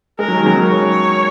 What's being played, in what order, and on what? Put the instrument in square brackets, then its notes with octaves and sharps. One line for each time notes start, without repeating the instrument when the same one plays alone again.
[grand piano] G#3 [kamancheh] A#4
[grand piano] F#3
D#3
C#3 F#3
[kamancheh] C#5